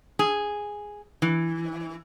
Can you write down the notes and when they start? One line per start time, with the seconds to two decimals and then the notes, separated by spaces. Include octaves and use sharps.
0.19 G#4
1.22 E3